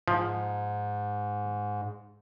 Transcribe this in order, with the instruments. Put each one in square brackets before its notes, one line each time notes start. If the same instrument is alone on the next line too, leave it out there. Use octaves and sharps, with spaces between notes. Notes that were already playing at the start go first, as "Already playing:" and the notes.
[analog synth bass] G#2 [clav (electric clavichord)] F3